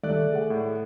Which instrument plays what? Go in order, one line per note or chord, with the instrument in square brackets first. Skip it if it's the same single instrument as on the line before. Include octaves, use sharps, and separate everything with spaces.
[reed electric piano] D2 D#3 G3 [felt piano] A3 [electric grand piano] D5 F#6
[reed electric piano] G#4 F#5
[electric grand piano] A2